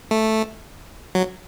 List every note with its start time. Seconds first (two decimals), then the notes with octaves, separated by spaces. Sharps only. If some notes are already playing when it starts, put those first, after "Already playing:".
0.11 A3
1.15 F#3